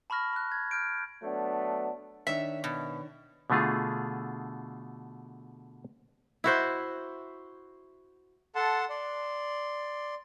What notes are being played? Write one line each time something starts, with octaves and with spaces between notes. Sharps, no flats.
A5 B5 C#6 F6 A#6
B5 F#6
G#6
F6 G6 D7
F#3 A3 B3 D4
D#3 D4 C#5 E5
B2
B2 D3 A3 F4 G#4
E4 F#4 C5
A4 F#5 A5 C6
D5 C6